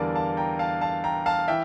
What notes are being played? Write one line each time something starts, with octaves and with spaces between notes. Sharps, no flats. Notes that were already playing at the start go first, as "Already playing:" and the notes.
Already playing: E2 D3 G3 A#4 D5 F5 A5
F5 A5
G5 A#5
F5 A5
F5 A5
G5 A#5
F5 A5
E3 E5 G5